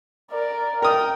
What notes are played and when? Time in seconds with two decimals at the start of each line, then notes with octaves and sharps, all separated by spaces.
0.31 A#4 D5
0.82 A#4 G5 D#6